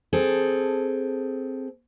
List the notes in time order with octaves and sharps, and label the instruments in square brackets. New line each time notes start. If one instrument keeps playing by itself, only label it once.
[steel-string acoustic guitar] C4 G#4 A4